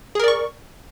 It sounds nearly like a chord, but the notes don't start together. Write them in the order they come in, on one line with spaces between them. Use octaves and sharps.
G#4 A#4 D5 C#6